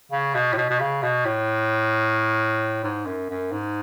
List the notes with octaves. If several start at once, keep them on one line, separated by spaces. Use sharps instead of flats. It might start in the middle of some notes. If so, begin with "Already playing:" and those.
C#3
B2
A2
B2
B2
C#3
B2
A2
G#2
F#2
F#2
G#2